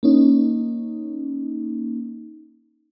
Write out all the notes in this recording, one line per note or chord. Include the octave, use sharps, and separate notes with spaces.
A#3 C#4 D#4